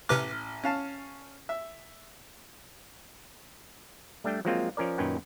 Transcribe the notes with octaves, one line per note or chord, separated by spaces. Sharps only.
A1 C3 B4 D6 F6
C#4 F5 A5
E5
G3 A3 D4 G5
F3 F#3 G#3 A#3 C4 F4
F3 C#4 A#4 D5
F#2 A#2 D#3 C#4 B4 G5